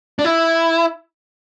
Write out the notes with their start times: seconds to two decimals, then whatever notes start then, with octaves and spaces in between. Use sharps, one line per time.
0.19 D4
0.25 E4